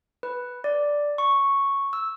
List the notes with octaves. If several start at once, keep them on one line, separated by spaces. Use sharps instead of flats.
B4
D5
C#6
E6